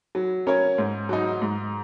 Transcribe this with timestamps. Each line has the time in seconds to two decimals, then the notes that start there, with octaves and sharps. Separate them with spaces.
0.15 F#3
0.47 C#4 A#4 C#5
0.78 G#2
1.09 F#3 D#4
1.42 G#2